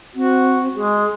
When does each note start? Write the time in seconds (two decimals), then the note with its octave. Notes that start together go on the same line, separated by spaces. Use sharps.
0.15 C4 F#4
0.75 G#3 G#4